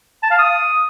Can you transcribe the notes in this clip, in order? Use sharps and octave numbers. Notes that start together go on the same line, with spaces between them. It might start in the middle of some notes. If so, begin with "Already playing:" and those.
A5
F5
D#6